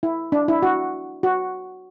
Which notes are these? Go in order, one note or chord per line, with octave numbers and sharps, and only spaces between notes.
E4
D4
E4
F#4
F#4